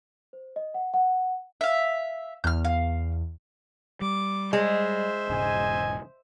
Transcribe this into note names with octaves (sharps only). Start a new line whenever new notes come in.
C5
D#5
F#5
F#5
E5 F5
E2 F6 G6
F5
G3 D6
G#3 C5 E5
E1 G#2 C#3 D#5 G#5